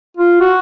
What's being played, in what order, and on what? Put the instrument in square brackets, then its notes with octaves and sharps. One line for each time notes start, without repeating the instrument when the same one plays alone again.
[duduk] F4
F#4